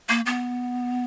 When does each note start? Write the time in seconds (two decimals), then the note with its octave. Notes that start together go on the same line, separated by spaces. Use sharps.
0.09 A#3
0.26 B3